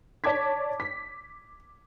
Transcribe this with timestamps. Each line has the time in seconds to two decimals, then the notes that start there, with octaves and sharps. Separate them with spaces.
0.24 C#5 D5 A5 D6 G#6 B6
0.80 B6